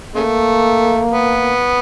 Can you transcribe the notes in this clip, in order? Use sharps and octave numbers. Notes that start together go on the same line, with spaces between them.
C#3 A3 A#3
B3